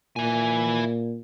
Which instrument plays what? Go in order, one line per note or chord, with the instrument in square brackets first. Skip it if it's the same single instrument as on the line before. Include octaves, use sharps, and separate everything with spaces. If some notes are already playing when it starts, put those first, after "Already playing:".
[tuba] A#2 [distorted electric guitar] E4 G#5